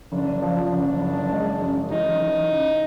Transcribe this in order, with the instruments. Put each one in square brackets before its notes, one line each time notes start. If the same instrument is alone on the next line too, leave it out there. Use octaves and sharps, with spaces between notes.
[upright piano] F#1 [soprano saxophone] D4
[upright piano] F3
F#1
F#1
G#3
F#2
[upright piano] E3 [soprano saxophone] D#4
[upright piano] E3
C#3